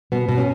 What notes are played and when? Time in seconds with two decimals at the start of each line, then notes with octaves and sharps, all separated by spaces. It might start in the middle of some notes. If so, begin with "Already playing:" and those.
0.12 B2 B3
0.29 B2
0.38 C#4